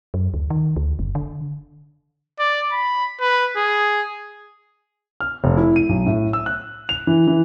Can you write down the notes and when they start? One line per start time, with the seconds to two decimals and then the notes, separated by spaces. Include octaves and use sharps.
0.14 F#2
0.34 D2
0.50 D#3
0.76 D2
0.99 F#1
1.15 D3
2.39 D5
2.72 B5
3.21 B4
3.57 G#4
5.20 F6
5.44 F1
5.57 E4
5.76 D#7
5.89 B1
6.06 A2
6.33 E6
6.46 F#6
6.89 F7
7.07 E3
7.27 E3